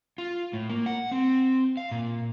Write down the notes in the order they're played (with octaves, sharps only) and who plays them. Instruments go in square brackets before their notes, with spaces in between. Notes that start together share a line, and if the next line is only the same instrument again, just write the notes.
[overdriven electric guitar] F4
A2
A#3
F#5
C4
F5
A#2